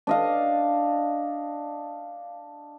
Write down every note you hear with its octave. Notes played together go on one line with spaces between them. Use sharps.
D4 D#5 F5